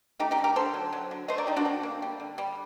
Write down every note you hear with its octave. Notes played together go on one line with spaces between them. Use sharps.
A3 D#4 G4
D#4 G4
D3
G4 A#4
D3 A4 C5
F#3
F#3
D3
A3 C5 D#5
A#4 D5
D3 D#4 G4
D4 F#4
D3 C4
A#3
G3
D3
G3